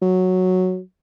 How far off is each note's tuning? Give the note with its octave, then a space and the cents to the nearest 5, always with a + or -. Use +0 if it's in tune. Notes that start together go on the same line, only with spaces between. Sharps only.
F#3 -5